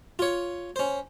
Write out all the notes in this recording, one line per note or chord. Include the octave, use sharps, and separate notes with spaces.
F4 C#5
C#4 C5